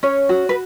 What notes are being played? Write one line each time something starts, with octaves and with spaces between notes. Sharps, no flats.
C#4 C#5
F#4
B4